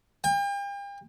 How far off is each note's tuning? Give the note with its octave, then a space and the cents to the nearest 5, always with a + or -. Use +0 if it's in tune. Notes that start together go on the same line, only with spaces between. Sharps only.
G5 +40